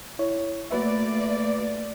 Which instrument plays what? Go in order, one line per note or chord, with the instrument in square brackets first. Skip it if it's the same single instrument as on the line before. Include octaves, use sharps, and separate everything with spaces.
[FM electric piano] E4 C#5
[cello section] A3 A#3 D5 [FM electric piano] F#4 B4 E5